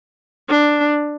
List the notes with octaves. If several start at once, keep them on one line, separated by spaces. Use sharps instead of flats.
D4